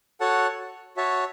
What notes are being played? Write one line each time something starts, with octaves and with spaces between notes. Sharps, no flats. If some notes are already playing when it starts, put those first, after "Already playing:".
F#4 A4 C#5 F#5 A5
F#4 C#5 E5 A5